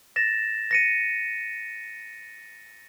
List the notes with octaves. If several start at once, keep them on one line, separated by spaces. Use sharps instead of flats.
A6 A#6 E7
A#6 C#7 D#7